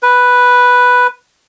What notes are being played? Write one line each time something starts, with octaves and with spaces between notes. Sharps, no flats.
B4